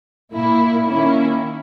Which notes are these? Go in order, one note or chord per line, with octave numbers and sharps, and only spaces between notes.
A#2 A#3 E4
D#3 A#3 C#4 E4